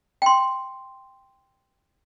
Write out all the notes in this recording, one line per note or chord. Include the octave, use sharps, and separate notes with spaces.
G5 C6